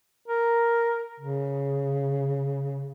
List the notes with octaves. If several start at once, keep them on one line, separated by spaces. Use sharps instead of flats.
A#4
C#3